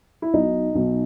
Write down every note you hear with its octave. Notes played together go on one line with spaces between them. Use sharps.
E4
B1 B2 D#4
B1 B2